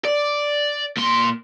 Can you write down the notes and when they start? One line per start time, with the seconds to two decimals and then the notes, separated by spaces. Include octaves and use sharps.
0.05 D5
0.97 A#2 C6